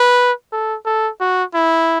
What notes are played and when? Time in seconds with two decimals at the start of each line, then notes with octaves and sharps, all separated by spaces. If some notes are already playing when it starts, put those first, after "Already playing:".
Already playing: B4
0.53 A4
0.86 A4
1.20 F#4
1.54 E4